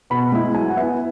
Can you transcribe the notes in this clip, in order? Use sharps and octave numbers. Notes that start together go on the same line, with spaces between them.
B2 B5
G#3 E4
F#3 G#5
F#5
B3 E4 E5